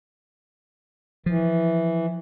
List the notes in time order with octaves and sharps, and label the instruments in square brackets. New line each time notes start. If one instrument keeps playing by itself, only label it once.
[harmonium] E3 [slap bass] F3